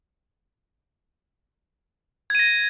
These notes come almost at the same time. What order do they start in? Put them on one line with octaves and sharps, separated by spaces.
G#6 D#7 A#6